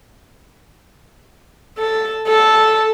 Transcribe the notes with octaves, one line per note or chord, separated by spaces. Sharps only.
A4
A4